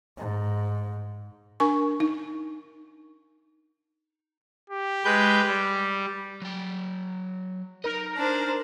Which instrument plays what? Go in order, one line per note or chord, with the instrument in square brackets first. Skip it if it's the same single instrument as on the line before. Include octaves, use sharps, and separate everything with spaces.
[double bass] G#2
[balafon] D4 A#4 G#5 C#6
D#4
[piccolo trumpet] G4
[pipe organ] G#3 B4 G6
G3
[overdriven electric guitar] F#3 G5
[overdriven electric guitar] D#4 D#5 [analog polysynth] A#4
[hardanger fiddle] D4 C5